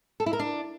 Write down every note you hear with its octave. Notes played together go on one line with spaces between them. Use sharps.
A4
E4
A#4
D4